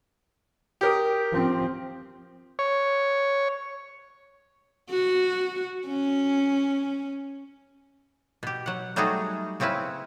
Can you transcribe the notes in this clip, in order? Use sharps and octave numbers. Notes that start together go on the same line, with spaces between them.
G4 A#4 D#6
F3 C4
C#5
F#4
C#4
B2 G4
F#3 F#5
F#3 G3 A3 D#4 F#4 G#4
C#3 C4 C#4 E4 B4